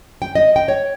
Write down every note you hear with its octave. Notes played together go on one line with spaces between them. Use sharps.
G5
D#5
G5
C#5